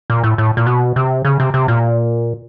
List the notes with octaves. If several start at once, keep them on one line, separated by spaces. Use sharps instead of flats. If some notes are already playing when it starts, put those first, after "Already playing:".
A#2
A2
A2
A#2
B2
C3
C#3
C3
C3
A#2